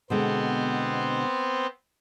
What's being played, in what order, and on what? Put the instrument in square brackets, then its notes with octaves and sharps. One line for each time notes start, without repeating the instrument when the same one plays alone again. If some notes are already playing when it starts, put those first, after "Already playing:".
[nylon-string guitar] B2 D3 G#3 [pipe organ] B3 C4 C5